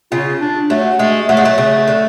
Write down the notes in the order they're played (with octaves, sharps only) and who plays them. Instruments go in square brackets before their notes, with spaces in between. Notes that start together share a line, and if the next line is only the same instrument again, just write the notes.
[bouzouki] C#3 [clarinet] F4
[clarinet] D4
[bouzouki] F#3 [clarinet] A3
[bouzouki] G#3 [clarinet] A3
[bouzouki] F#3 [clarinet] A3
[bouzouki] G#3
F#3
C#3
D3